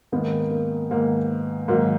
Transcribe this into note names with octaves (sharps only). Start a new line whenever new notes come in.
G#2 D#3 A#3 B3
A#3
G#2 D#3 A#3
G#2 D#3 F#3 A#3